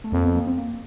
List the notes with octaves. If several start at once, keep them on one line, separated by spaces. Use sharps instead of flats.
A3
F2 A#3
B3
A#3
C4
A#3